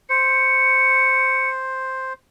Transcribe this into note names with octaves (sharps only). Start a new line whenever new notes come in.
C5 C#7